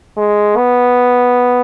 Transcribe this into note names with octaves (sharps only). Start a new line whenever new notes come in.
G#3
B3